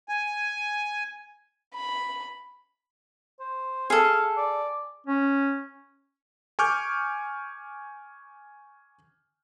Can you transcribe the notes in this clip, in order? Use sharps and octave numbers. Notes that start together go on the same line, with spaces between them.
G#5
B5
C5
G#4 A4 F5
D5
C#4
G#5 C#6 D6 F6 G6